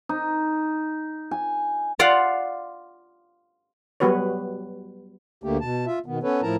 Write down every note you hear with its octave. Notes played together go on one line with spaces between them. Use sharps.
D#4
G#5
F4 D5 F5 F#5
F#3 G3 B3 F#4 B4 C#5
D2 D3 A3 A#3 G4
B2 A5
F4 E5
B2 D#3 B3
B3 C#4 A4 B4 C#5
A2 F3 E4 A#4 A5 A#5